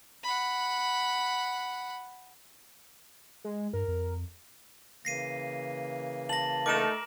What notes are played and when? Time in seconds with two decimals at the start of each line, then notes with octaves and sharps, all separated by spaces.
0.23 F#5 B5
3.45 G#3
3.73 G2 A#4
3.88 F2
5.05 C#3 E3 A#3 A#6 C7 D#7
6.29 A5 A#6 F#7
6.66 A3 D#4 A#4 D6 D7 E7